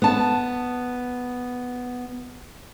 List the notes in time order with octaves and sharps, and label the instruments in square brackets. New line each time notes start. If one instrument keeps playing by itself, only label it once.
[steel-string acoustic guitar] B3 A5